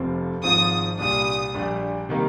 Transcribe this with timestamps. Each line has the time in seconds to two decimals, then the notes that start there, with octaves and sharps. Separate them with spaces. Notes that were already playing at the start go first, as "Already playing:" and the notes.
Already playing: F1 F2 C3 F3 C4
0.43 G#1 G#2 F3 C4 F4 D#6
0.99 C2 A#2 G3 D4 D#6
1.54 A#1 A#2 G3 D4 G4
2.09 C3 D#3 G3 A#3 D#4